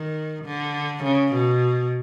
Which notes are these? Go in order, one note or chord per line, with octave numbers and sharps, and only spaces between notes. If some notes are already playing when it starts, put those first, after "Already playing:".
Already playing: D#3
D3
C#3
B2